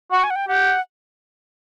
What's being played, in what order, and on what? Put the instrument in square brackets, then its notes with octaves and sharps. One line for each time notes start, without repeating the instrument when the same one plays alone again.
[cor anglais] F#4 [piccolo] F#5
[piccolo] G#5
F#5
G5
[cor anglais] G4 [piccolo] F#5